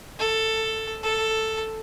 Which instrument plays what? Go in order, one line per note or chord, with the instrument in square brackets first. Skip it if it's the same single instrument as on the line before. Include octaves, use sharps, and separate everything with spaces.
[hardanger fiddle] A4
A4